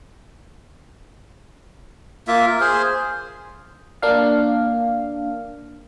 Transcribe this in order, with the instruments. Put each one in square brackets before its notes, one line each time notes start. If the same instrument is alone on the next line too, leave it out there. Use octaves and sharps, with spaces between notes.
[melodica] A#3 F4 E5
A#4
G#4 C5
[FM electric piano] A#3 D4 F5